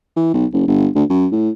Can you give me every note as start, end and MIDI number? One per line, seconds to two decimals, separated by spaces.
0.17 0.33 52
0.34 0.46 35
0.53 0.66 30
0.68 0.89 31
0.95 1.04 38
1.10 1.27 42
1.32 1.50 45